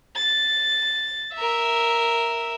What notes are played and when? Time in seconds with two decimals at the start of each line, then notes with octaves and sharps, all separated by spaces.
0.16 A6
1.35 A#4 E5